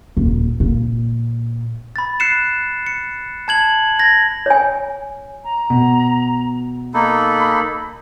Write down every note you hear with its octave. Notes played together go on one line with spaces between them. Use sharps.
D#1
A#2
B5 A6
F#6 C7 C#7 E7
C#7
A5 G#6 F#7
G#6 A#6
C#5 G#5
A#5
B2
A#3 D#4 A4 B5